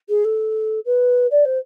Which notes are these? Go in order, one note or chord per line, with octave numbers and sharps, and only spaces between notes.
G#4
A4
B4
D5
C5